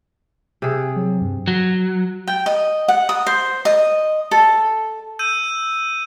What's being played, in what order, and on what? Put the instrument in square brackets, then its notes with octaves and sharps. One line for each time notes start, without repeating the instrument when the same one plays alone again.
[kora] C3 G#4
[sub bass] F#3
G2
[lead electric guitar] F#3
[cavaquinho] G5
D#5
F#5
D#6
C5
D#5
A4
[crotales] E6 G6 D#7